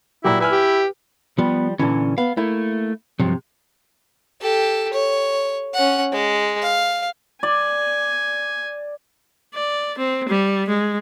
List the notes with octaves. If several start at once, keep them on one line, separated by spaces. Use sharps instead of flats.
A#2 F#3 E4 G4
E4 B4 G#5 F6
G4
F3 G3 B3
A#2 D3 E3 C#4
B3 F5
A3 A#3 E4
G2 C3 F3 F#3
G4 A4
C#5
C#4 F#5
G#3
F5
D5 G#5
D5
C4
G3
G#3